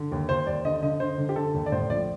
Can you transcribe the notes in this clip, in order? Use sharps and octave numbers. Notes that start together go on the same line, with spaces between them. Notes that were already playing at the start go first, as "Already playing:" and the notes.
Already playing: D3
D#2
D#2 C5
D#2 D5
D3 D#5
D3 D#5
D3 C5
D3
G4
D3 A4
D#2
D5
A2 C5
A#1 D5